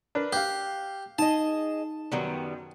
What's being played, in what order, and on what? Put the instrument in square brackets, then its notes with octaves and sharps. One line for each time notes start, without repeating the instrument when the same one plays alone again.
[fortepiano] D4 A#4 B4
[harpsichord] G4 [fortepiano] F5 F#6
[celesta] D#4 [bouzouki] G#4 D#5 [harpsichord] A5
[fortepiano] F#2 F#3 [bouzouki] D#3 G3 B3